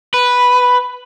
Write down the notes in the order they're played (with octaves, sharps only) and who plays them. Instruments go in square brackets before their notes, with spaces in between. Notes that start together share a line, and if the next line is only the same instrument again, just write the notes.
[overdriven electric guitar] B4